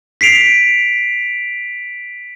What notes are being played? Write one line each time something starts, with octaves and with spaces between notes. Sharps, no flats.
B6 C7 D7 F7